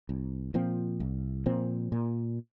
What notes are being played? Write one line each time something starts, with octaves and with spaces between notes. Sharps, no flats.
C2
A#2 F3 C4
C2
A#2 F3 C4
A#2